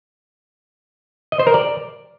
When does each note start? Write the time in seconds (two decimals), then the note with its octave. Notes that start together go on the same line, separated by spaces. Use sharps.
1.32 D#5
1.39 C5
1.47 A#4
1.54 D5